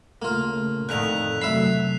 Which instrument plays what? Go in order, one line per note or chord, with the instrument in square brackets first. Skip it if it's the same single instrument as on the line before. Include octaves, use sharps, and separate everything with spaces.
[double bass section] C#3 A3 [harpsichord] A#3 F4
[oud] F2 D3 D#3 [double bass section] A2 [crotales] F#6 B6 F7
[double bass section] C3 F#3 A3 [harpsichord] E5 B5 [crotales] C7 E7